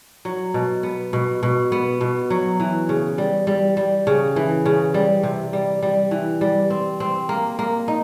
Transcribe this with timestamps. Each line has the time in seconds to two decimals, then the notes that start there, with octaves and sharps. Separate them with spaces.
0.25 F#3
0.54 B2
0.83 B3
1.13 B2
1.43 B2
1.72 B3
2.01 B2
2.30 F#3
2.60 E3
2.89 C#3
3.18 G3
3.47 G3
3.77 G3
4.07 C#3
4.36 E3
4.66 C#3
4.94 G3
5.23 C3
5.53 G3
5.82 G3
6.11 E3
6.41 G3
6.70 C4
7.00 C4
7.29 A#3
7.59 A#3
7.88 D#4